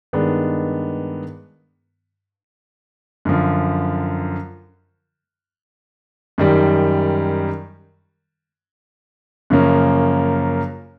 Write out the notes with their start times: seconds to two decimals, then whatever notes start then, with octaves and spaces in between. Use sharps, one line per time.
0.13 G2 D#3 G#3 B3 D4
3.25 F#2 D3 F3
6.38 F#2 D#3 G3
9.50 F#2 C#3 F3 A#3 C#4